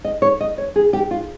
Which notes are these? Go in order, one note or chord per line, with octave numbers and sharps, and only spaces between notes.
D#5
C#5
D#5
C#5
G#4
G4
F4